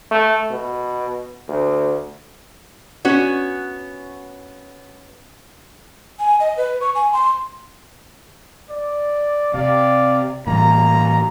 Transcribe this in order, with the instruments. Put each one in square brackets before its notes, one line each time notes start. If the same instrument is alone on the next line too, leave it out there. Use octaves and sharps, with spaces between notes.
[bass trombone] A3
B2
D2
[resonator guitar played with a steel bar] B3 C#4 F#4
[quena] G#5
D#5
B4
C#6
G#5
C6
[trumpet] D5
[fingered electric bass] C3 [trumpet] D5 [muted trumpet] F5
[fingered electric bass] A2 E3 G3 [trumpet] A#3 [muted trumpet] A#5